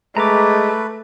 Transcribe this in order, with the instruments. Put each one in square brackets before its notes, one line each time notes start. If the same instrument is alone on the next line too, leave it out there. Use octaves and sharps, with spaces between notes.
[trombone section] G#3 [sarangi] A3 [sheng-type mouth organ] B4 [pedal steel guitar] A#5 D6